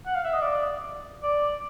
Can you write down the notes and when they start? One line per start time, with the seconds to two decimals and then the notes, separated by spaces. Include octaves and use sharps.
0.06 F#5
0.15 F5
0.24 E5
0.33 D#5
0.42 D5
1.23 D5